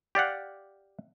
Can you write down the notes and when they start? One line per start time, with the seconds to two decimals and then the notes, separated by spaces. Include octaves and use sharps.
0.15 G4 D5 F5 F#5